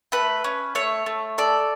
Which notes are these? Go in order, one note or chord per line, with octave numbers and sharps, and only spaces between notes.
A3 B4
C#4
A3 C#5
A3
A4 D5